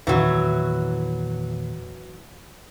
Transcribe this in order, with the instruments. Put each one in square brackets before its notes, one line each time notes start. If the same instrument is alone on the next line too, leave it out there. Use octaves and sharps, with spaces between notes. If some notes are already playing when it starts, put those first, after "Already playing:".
[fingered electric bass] E2 A#2 D#3 [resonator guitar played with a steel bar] E3 F#3